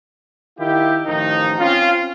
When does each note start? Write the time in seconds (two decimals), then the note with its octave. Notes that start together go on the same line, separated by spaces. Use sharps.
0.59 D#3 E4 F4 G4
1.06 A1 D#3 F3 D#4
1.59 C4 C#4 F4